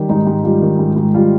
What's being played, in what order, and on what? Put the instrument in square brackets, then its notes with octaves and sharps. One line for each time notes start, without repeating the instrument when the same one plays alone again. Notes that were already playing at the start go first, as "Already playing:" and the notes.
Already playing: [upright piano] D#3 G3 G4
G#2 D#4
G#2
G3 F4
D#3
G#2
G#2
G3 F4